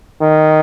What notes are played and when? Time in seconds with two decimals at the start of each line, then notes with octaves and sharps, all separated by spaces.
0.21 D#3